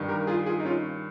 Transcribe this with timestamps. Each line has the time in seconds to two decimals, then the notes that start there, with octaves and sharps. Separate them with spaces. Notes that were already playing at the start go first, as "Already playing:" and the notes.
Already playing: G2 D#3
0.08 G4 A#4
0.27 F4 G#4
0.46 F4 G#4
0.60 D#4
0.65 C#4 F4